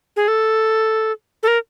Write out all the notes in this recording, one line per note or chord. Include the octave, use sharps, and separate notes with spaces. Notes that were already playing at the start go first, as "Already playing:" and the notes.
G#4
A4
A4
A#4